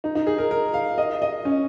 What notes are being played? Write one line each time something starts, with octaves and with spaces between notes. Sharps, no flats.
D#4
D#4
G#4
A#4
A#4
F5
D#5
D#5
C#4